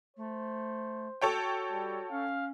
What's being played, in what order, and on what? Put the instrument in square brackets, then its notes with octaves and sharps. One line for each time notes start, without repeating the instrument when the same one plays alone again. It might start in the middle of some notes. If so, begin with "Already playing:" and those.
[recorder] A3 [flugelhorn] C5
[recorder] F#4 [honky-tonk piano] A4 C#5 G5
[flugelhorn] G3
[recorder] C#4 [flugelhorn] F5